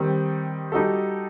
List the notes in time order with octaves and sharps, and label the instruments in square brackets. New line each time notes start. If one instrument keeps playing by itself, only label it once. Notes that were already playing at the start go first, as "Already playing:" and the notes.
Already playing: [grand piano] D#3 G3 C4
G3 D#4 F#4 A4